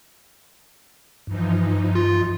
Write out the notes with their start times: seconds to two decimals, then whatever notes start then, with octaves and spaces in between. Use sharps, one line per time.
1.27 G2 E3 F3 D#4
1.95 F4